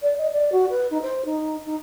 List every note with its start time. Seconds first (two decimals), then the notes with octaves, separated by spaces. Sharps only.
0.02 D5
0.18 D#5
0.32 D5
0.52 F#4
0.69 B4
0.91 D#4
1.02 C5
1.25 D#4
1.66 D#4